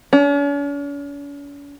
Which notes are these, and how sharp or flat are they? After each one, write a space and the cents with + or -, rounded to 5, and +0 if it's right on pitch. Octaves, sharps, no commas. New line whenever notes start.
C#4 +45